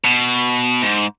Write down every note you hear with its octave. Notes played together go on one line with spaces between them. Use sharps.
B2
G#2